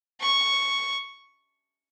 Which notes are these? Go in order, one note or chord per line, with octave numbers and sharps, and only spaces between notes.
C#6